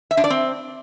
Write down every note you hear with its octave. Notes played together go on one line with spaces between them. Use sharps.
E5
D4
D5
C4